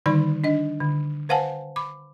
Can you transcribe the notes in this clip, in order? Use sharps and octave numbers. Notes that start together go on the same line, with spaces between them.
D3 D#3 G3 D#4 D5 B5
D4 D#5
D3
B4 C5 F5 F#5 G#5 A5
B5 D6